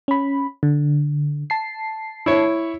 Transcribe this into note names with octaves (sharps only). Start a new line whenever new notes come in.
C#4 B5
D3
A5 C7
E4 C#5